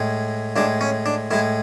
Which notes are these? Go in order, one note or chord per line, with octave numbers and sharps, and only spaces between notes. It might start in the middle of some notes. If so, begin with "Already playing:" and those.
Already playing: A2 G#3
A2 G#3 D4
C#4
D4
A2 G#3 E4